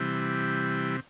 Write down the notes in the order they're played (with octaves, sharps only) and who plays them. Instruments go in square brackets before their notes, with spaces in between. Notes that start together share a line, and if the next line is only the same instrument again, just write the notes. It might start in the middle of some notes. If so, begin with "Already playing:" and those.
Already playing: [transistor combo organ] C3 E3 G3